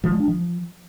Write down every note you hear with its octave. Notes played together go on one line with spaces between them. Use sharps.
F3
G#3
D4
F3